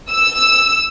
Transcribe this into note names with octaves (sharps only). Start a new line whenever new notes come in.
E6